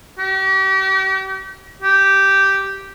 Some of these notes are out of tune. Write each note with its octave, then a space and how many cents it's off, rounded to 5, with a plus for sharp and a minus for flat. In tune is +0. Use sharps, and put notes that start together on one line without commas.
G4 -40
G4 -5